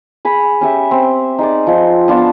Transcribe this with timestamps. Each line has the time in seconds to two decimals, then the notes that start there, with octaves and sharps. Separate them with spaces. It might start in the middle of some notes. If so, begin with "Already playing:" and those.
0.25 G#4 B5
0.61 C#4 G4 E5
0.91 C4
1.39 D#4 G#4 D5
1.67 F3 D#4
2.08 B3 D4 F4 A5